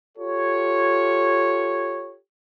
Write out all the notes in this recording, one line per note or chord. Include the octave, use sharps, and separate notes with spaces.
F4 G4 A4 C#5